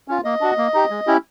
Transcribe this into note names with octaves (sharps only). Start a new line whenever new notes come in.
C#4 F4
A#3 D#5
D4 F#4
A#3
D#4 G4
G#3
C#4 E4 G4